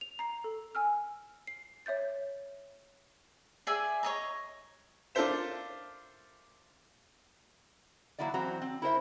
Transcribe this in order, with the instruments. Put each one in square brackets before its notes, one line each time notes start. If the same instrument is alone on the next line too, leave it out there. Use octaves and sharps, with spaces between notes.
[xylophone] F7
A#5 C7
A4
G#5 E6 F6
C7
C#5 E5 G6 A6
[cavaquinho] G#4 D5 E5 G#5
C#5 D#5 A#5
[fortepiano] D4 F4 A4 A#4 C5 E5
[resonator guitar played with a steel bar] F#3 G#3 A#3 E4 F#4 D5
E3 F#3 C4 F#4 A#5
C4
E4 A#4 C5 E5